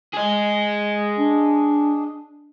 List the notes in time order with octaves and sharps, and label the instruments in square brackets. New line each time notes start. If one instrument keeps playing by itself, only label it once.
[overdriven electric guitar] G#4 D#5
[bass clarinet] D4